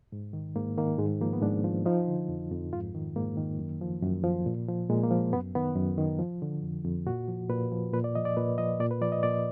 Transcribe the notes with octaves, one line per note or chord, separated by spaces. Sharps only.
G#2
D#3
G#2 A#3
D#3 A#3
G#2 G#3
F3 A#3
B3
G#2 D4
F3
F3 D#4
D3
F2
F2
G#2 F4
D#3
G#2 A#3
D#3
F#2
F3
F#2
F3
A#2
F3
A#2 G#3
A#3
F3
F#2 B3
D#3 B3
F#2
D#3
F3
D3
F2
F2
A#2 F#4
F3
A#2 B4
F3
A#2 B4
D5
F3 D#5
D5
A#2 B4
F3 D#5
A#2 D5
B4
F3 D5
D#5
A#2 D5